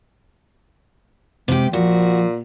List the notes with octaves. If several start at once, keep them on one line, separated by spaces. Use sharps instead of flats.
C3 G#3 G4
A#2 F3 F#4